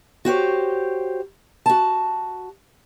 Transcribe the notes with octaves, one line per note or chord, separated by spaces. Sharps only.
F#4 G4 C5 C#5
F#4 A5